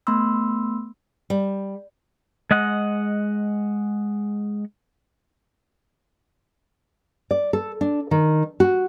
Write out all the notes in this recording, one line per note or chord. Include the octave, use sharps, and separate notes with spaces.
A3 B3 B5 C6 E6
G3
G#3 D#5 F#5
D5
A4
D4
D#3
F#4